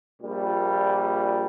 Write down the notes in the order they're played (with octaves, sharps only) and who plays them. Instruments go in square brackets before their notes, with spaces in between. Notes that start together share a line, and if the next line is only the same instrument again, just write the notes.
[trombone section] A#1 A#2 G3